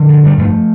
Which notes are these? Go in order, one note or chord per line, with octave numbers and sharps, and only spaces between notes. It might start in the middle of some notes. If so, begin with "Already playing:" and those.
Already playing: D3 F3
G2
G2 G3
G2 F3 A3